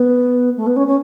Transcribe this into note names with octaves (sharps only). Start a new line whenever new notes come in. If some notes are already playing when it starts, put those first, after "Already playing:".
Already playing: B3
A3
B3
C#4
C#4